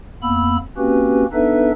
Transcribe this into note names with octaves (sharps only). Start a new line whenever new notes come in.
F2 A#3 B3 B5 E6
A#3 C4 C#4 F#4 G4 B4
B3 D4 D#4 A4 B4 E5